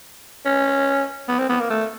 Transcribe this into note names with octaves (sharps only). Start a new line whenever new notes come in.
C#4
B3
C4
B3
A#3
A3